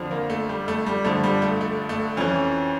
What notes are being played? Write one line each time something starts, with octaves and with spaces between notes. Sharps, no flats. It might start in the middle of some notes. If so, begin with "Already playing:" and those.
Already playing: F2 D3 F3
A#3
A3
G3
A3
G3
G2 D3 F3 A3
G3
A3
A3
A3
F2 E3 C#4